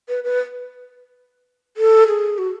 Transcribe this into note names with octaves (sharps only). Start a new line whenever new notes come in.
B4
B4
A4
G#4
F#4